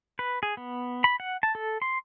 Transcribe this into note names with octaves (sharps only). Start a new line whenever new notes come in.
B4
G#4
B3
B5
F#5
A5
A4
C6